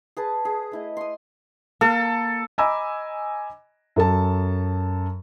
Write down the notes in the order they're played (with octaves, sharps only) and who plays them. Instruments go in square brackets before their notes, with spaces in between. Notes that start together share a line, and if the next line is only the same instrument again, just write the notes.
[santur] G#4 B4 A5
G#4
A3 E4 D#5
C6 D#6
[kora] A#3 [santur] A4
[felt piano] D#5 G#5 A#5 B5 D6 E6
F#2 A4 A5